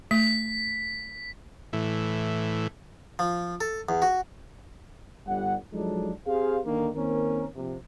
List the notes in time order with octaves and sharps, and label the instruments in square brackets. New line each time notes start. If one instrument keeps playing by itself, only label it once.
[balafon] A3 [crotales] B6
[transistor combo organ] A2 E3
[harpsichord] F3
A4
E2
F#4
[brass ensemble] G1 G3 F#5
F3 F#3 G#3 D4 D#4 A4
C4 G4 G#4 C5 F5
D3 D#3 A#3
D#3 A#3 C4 C#4 A#4
A#1 C3